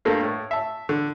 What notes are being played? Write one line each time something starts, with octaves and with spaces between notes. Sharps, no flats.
G2 A3 A#3
A2
E5 A5
D3